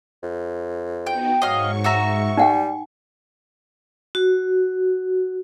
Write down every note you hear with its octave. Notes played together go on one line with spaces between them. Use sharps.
F2
B3 D#4 F#4 G5
G#2 F#3 D#5 F5 C#6
F#4 E5 A#5
G3 D#4 F#5 G5
F#4